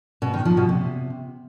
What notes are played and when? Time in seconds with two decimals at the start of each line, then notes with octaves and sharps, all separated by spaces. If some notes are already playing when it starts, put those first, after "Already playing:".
0.22 B2
0.34 D#3
0.45 F3
0.57 B2
0.69 C3